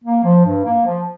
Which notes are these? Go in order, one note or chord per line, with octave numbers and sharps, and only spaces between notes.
A#3
F3
G2
A#3
F3